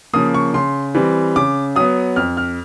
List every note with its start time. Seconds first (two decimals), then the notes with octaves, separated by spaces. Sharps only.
0.13 C#3 F3 A#3 D#6
0.34 C#6
0.54 C#3 C6
0.95 E3 G3 C4
1.36 C#3 D6
1.76 F#3 B3 D#6
2.16 F2 F6
2.37 F6